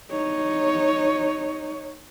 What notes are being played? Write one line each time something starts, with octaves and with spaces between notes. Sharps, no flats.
D#4 C#5